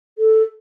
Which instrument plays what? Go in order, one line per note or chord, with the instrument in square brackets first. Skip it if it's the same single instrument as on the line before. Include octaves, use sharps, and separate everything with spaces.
[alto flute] A4